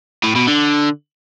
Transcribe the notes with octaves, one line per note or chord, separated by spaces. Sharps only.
A2
B2
D3